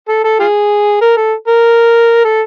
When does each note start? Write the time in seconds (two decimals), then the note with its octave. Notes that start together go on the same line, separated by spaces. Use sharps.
0.08 A4
0.24 A4
0.40 F4 G#4
1.01 A#4
1.17 A4
1.47 A#4
2.25 A4